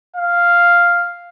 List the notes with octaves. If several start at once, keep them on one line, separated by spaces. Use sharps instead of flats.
F5